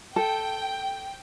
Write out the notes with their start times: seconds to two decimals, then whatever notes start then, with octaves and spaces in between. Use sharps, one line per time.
0.16 A4 G5